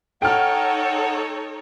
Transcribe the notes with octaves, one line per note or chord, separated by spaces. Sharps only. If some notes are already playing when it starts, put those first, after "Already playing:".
D#4 A4 C#5 F#5 G5 F6